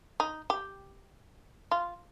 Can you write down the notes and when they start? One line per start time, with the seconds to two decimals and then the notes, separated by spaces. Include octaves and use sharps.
0.20 D#4
0.50 G4
1.71 F4